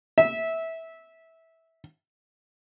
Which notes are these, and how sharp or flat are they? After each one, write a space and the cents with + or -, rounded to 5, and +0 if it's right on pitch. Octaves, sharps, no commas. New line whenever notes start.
E5 -15